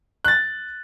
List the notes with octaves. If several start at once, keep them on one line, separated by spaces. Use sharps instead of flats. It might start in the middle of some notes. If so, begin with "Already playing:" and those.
F#6 A6